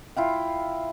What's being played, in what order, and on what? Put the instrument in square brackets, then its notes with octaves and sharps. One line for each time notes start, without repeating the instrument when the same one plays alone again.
[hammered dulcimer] E4 F4 G5